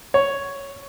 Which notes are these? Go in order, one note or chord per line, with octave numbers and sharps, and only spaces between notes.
C#5